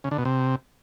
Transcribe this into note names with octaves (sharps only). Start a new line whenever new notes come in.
C#3
D3
B2
C3